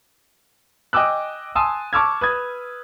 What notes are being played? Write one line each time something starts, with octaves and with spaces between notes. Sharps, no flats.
D#5 G5 G#5 D6 E6 F#6
G#5 A5 C6 D#6 E6
A5 C#6 D6 E6 F6 G#6
B4 D#6 G#6